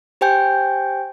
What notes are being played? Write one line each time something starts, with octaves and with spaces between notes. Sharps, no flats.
G4 C5 G5 G#5 G6